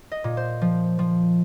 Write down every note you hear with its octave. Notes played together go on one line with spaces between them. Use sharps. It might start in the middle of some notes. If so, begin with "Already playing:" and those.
D#5
A#2
C5
F3
F3